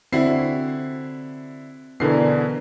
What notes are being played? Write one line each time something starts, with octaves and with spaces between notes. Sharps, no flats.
D3 C4 E4 F#4 C7
B2 D3 E3 B3 D4 A#4 C7